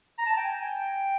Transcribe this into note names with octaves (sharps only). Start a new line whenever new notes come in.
A#5
A5
G5
G#5
G5